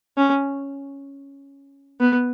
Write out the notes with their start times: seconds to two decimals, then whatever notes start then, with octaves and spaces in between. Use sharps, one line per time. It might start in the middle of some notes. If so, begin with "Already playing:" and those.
0.17 C#4
2.00 B3